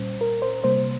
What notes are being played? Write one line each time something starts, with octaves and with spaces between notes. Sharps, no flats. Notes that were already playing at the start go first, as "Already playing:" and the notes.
Already playing: A#2 G3 C#4 C5
A#4
C5
C3 G3 A#3 C5